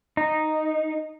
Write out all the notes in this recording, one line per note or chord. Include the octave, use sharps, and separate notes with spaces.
D#4